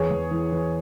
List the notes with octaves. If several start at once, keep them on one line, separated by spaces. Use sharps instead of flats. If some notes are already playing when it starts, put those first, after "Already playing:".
Already playing: E2 G#4 C#5
E2
E3
E3